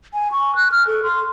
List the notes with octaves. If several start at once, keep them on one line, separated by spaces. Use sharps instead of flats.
G#5
C#6
F#6
F6
A4
C6